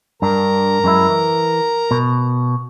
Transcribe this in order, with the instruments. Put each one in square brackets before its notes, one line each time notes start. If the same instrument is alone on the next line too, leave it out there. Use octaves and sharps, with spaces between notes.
[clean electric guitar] G2 D4 [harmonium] A#4 A#5
[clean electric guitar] F#2 G#3 E4
E3
B2